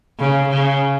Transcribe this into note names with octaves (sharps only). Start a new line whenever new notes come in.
C#3
C#3